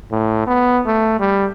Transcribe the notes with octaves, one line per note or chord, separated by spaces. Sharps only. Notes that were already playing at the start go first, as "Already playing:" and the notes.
A2
B3
A3
G3